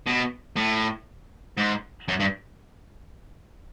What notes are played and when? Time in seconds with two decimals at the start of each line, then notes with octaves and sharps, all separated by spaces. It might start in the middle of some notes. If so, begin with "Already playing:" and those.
0.07 B2
0.57 A2
1.57 G#2
2.08 F#2
2.20 G2